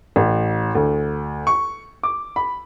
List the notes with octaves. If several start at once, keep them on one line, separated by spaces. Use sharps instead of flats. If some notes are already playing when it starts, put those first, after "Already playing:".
A1
D2
C#6
D6
B5